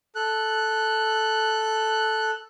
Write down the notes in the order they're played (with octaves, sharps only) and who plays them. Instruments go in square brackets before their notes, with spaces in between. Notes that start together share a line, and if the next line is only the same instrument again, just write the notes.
[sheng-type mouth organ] A4 F#6